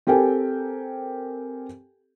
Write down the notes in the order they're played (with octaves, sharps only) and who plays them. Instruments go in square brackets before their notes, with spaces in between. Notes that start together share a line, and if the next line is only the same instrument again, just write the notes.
[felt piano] C4 G4 A4 A#4 G5 G#5